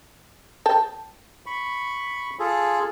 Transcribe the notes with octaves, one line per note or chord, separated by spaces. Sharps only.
G5 A5
B5 C#6
F4 G#4 A4